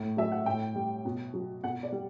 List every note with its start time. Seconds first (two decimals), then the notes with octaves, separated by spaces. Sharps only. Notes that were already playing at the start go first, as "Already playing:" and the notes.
Already playing: A2
0.17 F#3 E5
0.32 F#5
0.46 A2 G5
0.76 G3
1.05 B2
1.34 F#3
1.63 B2 F#5
1.83 D5
1.92 G3